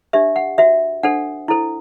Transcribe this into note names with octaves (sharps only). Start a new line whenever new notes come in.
D4 G4 C5 E5
F#5
F#4 C5 E5
D4 A4 C5 F#5
E4 A4 C5